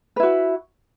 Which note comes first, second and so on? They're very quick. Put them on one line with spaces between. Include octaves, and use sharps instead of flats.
B4 E4 F#4